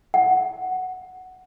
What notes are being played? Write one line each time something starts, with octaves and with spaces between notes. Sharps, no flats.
F#5